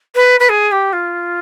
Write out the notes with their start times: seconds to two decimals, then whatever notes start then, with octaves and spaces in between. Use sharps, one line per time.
0.15 B4
0.40 B4
0.49 G#4
0.71 G4
0.92 F4